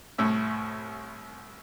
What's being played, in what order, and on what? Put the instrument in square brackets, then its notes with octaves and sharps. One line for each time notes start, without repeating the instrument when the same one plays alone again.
[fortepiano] C2 A2 E5